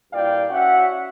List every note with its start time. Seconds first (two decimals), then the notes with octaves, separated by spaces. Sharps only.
0.13 G2 A#2 E4 D5 F5 G5
0.49 C#4 F#4 E5 F#5